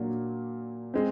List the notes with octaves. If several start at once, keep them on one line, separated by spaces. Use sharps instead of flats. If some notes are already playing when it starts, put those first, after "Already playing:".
Already playing: A#2 F#3 A#3 D4
G#3 C4